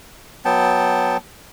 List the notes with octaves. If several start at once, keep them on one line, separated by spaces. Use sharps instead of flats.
F#3 B3 G5 A5